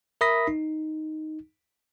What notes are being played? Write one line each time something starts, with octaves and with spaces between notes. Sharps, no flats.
A#4 E5 B5 D#6 A#6 B6
D#4